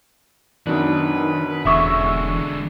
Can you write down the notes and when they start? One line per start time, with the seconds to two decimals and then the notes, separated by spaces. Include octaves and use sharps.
0.67 F#2 B2 D#3 D4 B4
1.65 E1 D3 G#3 E5 C#6 E6